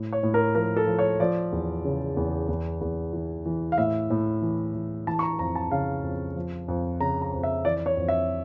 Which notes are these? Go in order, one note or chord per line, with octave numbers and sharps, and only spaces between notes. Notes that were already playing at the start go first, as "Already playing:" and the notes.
Already playing: A2
C#5
A2
A#4
F3 A#4
A4
F3
C#5
F3 D5
E2
C#3
E2
E2
E2
E3
E3
F5
A2 E5
A2
E3
E3
E3 A5
C#6
A#5
F2 A#5
A5
C#3 F5
F2
F3
F2
C#3 A#5
A#5
F2
E5
E3 D5
C#5
F2
E5